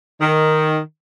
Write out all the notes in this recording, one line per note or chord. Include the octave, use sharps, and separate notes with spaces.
D#3